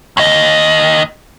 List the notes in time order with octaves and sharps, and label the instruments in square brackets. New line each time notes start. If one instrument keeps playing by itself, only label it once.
[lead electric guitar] D#2 D#5